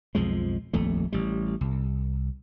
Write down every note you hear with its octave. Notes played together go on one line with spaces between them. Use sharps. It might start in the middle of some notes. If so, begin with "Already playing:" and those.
B1 F2 F3 G#3
D#1 A#1 F2 A3
A1 G3
C2